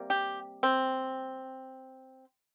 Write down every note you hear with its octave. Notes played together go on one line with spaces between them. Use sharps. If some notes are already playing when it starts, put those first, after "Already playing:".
Already playing: C3 G3 A#3
G4
C4